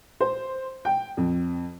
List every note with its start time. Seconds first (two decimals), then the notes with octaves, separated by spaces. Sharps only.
0.20 C5
0.85 G5
1.17 F2